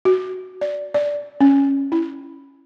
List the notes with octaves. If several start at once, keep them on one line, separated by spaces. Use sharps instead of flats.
F#4
D5
D5
C#4
E4